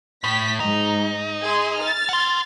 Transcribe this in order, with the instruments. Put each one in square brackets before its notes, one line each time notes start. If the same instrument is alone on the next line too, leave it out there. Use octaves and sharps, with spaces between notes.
[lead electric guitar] A2 [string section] G5 B6
[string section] G#2 [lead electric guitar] D#4
[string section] G#4 C6
F6 A6
[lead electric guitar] F#5 C6